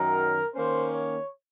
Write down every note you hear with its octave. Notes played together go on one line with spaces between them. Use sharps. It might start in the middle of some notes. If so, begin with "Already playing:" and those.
Already playing: F#2 D#3 F#3 A#4
D#3 A#3 C#4 C5
C#5